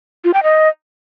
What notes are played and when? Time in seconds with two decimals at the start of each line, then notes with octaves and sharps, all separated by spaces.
0.24 F4
0.34 G5
0.43 D#5